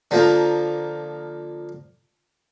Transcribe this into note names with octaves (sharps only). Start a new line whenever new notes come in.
D3 F3 A#3